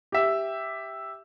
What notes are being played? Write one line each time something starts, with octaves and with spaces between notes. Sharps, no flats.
G4 E5